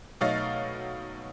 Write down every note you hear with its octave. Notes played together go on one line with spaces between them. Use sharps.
B2 F#3 A3 D#4 F5 A6